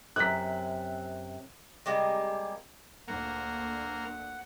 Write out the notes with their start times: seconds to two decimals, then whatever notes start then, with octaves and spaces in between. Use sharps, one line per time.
0.16 F#2 C3 F#6 B6
1.86 C3 G3 G#3 A#3
3.08 D2 A#2 A#3 F#5